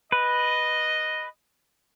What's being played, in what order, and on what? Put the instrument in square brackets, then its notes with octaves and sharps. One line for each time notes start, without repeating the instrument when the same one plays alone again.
[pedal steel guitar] B4 [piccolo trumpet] D#5